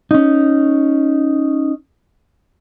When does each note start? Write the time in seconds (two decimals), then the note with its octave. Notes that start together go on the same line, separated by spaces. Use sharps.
0.11 C#4 D#4